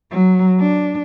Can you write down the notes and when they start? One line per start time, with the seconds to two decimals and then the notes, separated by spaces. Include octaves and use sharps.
0.11 F#3
0.59 D4